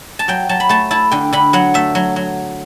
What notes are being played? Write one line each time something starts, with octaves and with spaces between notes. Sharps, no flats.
A5
F#3 G5
F#3 A5
B5
A3 A5
E4 A5
D3 G5
D3 B5
F#3 F#5
A3 E5
F#3
F#3